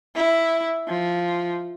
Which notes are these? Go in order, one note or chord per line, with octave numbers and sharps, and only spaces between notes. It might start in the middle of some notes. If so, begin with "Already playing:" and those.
E4
F3